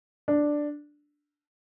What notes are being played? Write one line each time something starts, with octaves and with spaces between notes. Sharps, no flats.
D4